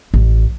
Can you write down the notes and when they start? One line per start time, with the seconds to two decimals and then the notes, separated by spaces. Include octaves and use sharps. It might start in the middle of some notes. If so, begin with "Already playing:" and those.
0.14 A1